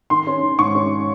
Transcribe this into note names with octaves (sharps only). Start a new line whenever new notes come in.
D#3 C6
C#4
D#3
G#2 C#6
C#4